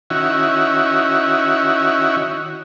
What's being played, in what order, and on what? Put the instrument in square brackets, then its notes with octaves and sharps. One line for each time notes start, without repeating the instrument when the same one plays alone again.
[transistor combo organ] D#3 C#4 E4 F#4